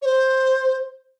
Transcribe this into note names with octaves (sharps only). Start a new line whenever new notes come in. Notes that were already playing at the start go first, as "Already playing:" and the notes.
C#5
C5